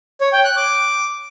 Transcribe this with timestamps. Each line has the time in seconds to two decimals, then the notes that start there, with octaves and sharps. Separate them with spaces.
0.21 C#5
0.33 G5
0.45 F#6
0.56 D6